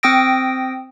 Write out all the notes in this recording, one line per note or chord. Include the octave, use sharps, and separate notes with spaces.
C4 G5 D#6 E6 A#6 D7